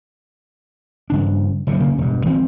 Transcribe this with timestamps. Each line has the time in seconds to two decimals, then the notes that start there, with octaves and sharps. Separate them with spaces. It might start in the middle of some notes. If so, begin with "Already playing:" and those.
1.10 G2 C#3 D4
1.67 F#1 G#2 C3
1.80 D2 C#3 A#3
1.98 E1 G2
2.26 G#1 E3 F3 C4